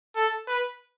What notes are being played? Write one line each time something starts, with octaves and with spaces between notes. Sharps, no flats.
A4
B4